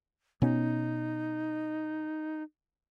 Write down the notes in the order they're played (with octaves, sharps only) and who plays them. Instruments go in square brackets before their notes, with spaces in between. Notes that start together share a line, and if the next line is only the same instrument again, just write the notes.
[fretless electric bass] B2 B3 C#4 [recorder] D#4